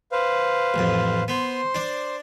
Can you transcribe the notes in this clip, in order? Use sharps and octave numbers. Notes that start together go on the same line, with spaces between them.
B4 C5 F5
A1 F2
B3 C5 C6
D4